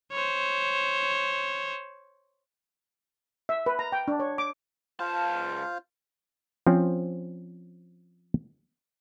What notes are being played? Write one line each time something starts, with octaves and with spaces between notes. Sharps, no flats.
C5 C#5
E5
B4
A#5
G5
D4
C#5
D6
C#2 F4 C5 F5 A5
F3 C4 C#4 F4